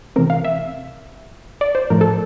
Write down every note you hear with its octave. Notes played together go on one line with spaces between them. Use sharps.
C3 E3 A3 C4 A#4
F5
E5
D5
C5
A2 F3 A3 A#4
A4